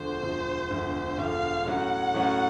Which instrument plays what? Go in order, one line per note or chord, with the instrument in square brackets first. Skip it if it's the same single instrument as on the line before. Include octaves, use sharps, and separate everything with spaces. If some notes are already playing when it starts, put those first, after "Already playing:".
Already playing: [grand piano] E1 D2 D3 F3 [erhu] C5
[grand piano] E1 D2 D3 F3
E1 D2 D3 F3
[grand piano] E1 D2 D3 F3 [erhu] F5
[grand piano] A2 F#3 A3 C#4 F#4 [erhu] F#5
[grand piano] A2 F#3 A3 C#4 F#4